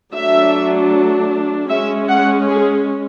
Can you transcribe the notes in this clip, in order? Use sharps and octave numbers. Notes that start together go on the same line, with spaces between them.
F#3 A3 D4 E5
G#3 C#4 E5
F#5
G#4